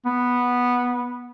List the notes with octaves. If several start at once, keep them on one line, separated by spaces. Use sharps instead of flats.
B3